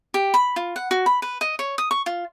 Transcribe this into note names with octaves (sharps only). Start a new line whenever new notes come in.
G4
B5
F4
F#5
F#4
B5
B4
D#5
C#5
D#6
C#6
F4